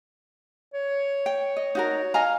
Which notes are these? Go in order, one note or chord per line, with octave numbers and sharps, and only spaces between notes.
C#5
G5
D#5
D#4 F#4 A#4
D#5 F5 G#5 A#5